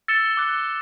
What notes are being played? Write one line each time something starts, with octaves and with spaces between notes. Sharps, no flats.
E6 A6 C#7 E7 G7
D6 F#6 C#7